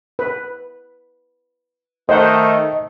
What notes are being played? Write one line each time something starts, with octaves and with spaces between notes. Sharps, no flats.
B4
D#3 A3 C5 D#5 F#5